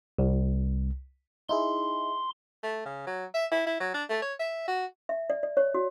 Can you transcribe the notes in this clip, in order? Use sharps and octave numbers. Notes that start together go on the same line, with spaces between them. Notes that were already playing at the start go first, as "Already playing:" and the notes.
C2
D#4 E4 G#4 C6
A3
C#3
F#3
E5
E4
E4
F#3
D4
A3
C#5
E5
F#4
E5
D5
D5
C#5
F#4